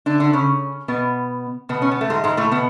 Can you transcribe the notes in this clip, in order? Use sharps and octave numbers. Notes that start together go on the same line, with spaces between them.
D3 D4
D3 D4
C#3 C#4
B2 B3
B2 B3
C#4
B3
A3
G#2 G#3
G#2 G#3
A2 A3
B2 B3